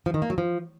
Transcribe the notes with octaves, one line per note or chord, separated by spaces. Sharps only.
F3
D#3
A#3
F#3
F3